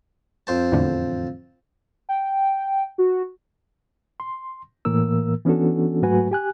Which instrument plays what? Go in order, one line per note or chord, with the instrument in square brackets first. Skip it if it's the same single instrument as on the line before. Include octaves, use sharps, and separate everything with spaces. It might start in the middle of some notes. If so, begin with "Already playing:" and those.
[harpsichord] F2 C5 A5
[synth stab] E2 A2 D3
[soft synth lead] G5
F#4
[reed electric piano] C6
A2 E3 A#3 A#4 E6
E3 B3 C#4 D4 F#4 A4
G#2 F#3 A3 F#4 B4 G#5
G4 G#5 F#6